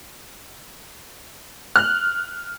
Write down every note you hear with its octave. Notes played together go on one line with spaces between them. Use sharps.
F6 F#6